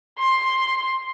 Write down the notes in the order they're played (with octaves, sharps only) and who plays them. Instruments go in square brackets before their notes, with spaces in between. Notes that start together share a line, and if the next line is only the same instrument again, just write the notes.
[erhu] C6